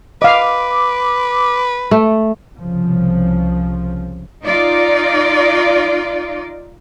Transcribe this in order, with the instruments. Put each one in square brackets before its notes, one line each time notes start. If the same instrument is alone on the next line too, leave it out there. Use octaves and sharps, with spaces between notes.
[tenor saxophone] B4 [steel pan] D#5 F5 [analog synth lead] D6
[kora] A3
[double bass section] C2 C#3 F3
[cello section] D#4 F4 D5